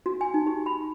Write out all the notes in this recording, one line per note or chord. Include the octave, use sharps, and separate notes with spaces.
F#4
G#5
D#4
G4
B5